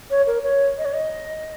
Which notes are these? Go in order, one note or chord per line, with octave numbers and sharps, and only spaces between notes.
C#5
A#4
C#5
D#5
C#5
D#5